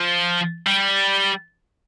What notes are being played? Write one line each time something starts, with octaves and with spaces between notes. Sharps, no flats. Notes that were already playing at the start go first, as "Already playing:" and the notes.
Already playing: F3
G3